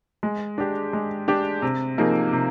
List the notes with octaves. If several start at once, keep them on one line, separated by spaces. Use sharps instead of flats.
G#3
D4 G4
G#3
D4 G4
C3
F3 A#3 D#4 G#4
C3